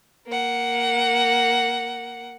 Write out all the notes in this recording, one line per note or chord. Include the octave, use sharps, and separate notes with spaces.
A#3 F#5